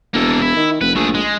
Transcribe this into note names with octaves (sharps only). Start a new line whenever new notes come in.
E1 A#3 A4
E4
D#3
F1 B4
A#1 A3 G#4
G#3